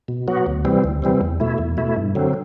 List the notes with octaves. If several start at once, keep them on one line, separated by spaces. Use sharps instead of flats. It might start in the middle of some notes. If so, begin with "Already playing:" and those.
B2
F#3 B3 F#4
D2
C3 E3 G3 C4
D2
C3 E3 G3 C4
E2
B2 A3 E4
E2
B2 A3 E4
G2
D3 F#3 C4